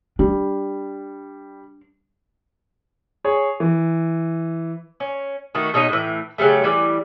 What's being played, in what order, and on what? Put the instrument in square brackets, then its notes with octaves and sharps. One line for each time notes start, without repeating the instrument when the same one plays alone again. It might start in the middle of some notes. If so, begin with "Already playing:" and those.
[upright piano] G3 [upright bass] D4
[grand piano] G#4 C#5
E3
[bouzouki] C#4
D#3 A3 F#4
B2 D#4 C#5 D#5
A2 E3
C#3 F#3 G3 A3
E3 G3